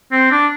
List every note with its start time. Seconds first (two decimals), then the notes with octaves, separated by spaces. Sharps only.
0.12 C4
0.31 D4